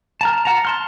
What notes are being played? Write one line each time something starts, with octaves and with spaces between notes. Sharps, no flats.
A5 A#5 F6
F#5 A5 A#5
A5 C6 F6